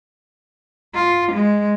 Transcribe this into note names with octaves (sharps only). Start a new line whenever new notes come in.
F4
G#3